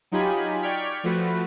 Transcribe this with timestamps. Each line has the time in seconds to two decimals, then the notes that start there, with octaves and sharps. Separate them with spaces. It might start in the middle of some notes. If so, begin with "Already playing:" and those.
0.12 F#3 D#4 F4 G4 G#5 B5
0.62 D5 G5 C#6 F6 G#6 B6
1.03 F3 A3 F#4 B4